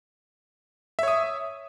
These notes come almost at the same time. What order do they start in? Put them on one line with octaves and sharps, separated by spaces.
E5 C#5 D#6